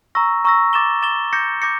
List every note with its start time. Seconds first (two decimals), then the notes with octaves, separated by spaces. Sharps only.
0.15 A#5 C#6 E6 A#6
0.45 A#5 C#6 E6 A#6
0.73 D6 A6 E7 G7
1.02 D6 A6 E7 G7
1.33 D6 G6 A#6 C#7
1.62 D6 G6 A#6 C#7